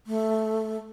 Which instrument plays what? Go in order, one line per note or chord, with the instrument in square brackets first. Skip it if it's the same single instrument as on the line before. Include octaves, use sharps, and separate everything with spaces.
[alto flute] A3